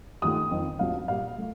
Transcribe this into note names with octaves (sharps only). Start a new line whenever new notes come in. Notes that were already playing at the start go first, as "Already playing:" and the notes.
D#2 D#3 A3 D#6
F2 D#3 A#3
D2 C3 F3 F5
A#2 G3 A#3 F5
A3